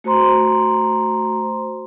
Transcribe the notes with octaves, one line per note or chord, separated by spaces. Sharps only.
A3 F#4 C5 A#5 C6